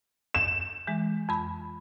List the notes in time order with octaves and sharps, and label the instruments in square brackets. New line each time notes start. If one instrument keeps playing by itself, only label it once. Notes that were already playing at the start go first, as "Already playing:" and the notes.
[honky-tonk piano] E7
[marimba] E3 G#3
F2 B5